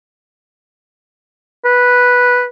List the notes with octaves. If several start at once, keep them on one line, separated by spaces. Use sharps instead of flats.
B4